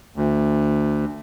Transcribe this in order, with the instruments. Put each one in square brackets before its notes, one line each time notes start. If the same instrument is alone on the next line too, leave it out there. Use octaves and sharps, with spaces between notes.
[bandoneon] D2